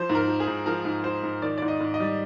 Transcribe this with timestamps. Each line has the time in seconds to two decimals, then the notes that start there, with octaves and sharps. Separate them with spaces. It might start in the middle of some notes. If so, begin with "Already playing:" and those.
Already playing: F3 C5
0.09 G#2
0.15 A#4
0.27 F3
0.40 G#4
0.48 G#2
0.66 F3 A#4
0.85 G#2
1.04 F3 C5
1.23 G#2
1.42 D#3 D5
1.58 G#2 D5
1.68 D#5
1.80 G#2
1.94 D#5
2.00 G3